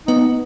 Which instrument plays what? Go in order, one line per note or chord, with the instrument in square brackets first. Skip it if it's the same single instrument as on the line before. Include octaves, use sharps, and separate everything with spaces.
[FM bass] B3 [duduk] D#4